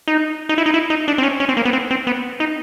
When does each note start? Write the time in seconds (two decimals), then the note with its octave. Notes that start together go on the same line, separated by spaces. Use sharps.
0.08 D#4
0.49 D#4
0.58 E4
0.66 D#4
0.74 E4
0.90 D#4
1.08 D4
1.18 C4
1.23 C#4
1.40 C#4
1.49 C4
1.57 A#3
1.65 B3
1.73 C4
1.91 C4
2.07 B3
2.40 D#4